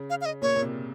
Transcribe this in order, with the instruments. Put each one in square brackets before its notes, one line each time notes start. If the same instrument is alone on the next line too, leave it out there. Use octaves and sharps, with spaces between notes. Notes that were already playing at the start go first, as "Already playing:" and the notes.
Already playing: [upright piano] C#3
[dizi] F5
F5
D#5
[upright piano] A#2 [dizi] C#5
[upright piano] A#2
C3